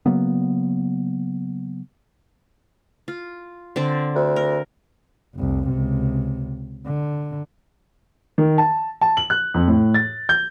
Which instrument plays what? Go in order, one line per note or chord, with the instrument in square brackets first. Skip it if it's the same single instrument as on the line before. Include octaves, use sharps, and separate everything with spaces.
[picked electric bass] C#3 F#3 A#3 B3
[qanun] F4
D3 C4 D5
[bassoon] D2
[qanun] A#4
[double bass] F1 C2
C#2 C3
D3
[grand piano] D#3
A5
A5
F#7
F#6
F2
A2
A6
G6